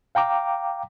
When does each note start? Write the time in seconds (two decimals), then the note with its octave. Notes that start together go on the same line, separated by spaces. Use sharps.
0.15 F5 G5 A#5 D6